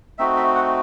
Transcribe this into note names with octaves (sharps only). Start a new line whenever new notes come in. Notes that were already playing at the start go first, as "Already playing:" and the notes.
A3 C4 D#4 F#4 E5
E5
F#5